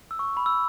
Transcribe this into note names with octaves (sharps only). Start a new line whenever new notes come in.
E6
C#6
B5
E6